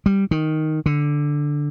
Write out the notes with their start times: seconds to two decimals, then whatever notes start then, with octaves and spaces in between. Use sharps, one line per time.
0.06 G3
0.31 D#3
0.86 D3